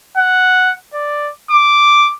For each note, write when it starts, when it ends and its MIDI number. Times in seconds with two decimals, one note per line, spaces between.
0.17 0.74 78
0.94 1.30 74
1.51 2.12 86